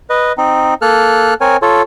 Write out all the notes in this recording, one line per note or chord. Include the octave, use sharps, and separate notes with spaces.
B4 D#5
C4 D#4
A#3 A4 F6 F#6
C4 A#4 C#5 G#5
F4 A4 C#5